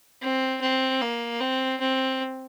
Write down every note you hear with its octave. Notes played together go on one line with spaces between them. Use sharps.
C4
C4
A#3
C4
C4